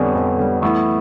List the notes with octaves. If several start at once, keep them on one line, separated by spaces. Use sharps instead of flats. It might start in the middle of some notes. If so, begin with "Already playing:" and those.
Already playing: F2 D3 G3 B3 C#4
F2
D3 G3
E3 A3 B3